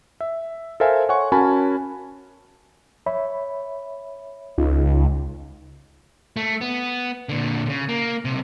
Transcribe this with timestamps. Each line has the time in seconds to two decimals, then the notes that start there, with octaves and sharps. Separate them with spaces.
0.21 E5
0.80 A4 A#4 C5 E5 F5 G#5
1.09 C#5 F#5 G#5 C6 C#6
1.32 C#4 F#4 A#4 G#5 A5 B5
3.06 C#5 E5 B5
4.58 C#2 D#4 F4
6.37 A3
6.61 B3
7.29 A#2 D3
7.66 A#2 C#3
7.89 A#3
8.25 B1 C3